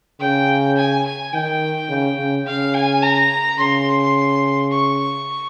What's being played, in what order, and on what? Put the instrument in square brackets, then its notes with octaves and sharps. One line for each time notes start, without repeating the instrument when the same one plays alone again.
[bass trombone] C#3 [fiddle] G5
[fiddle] G#5
G#5
[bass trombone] D#3 [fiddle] G5
[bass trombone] C#3
C#3
[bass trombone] C#3 [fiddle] F5
[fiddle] G#5
A#5
[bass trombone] C#3 [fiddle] C6
[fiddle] C#6